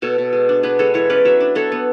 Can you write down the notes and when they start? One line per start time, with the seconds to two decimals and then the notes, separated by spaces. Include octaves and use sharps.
0.02 B2 A4 C#5
0.18 B2
0.33 G#3
0.49 D4
0.63 B3 G#4 B4
0.79 G#3 A4 C#5
0.94 E3 A4 C#5
1.10 C#4 B4 D5
1.25 F#3 C#5 E5
1.40 D4
1.55 B3 A4 C#5
1.72 B3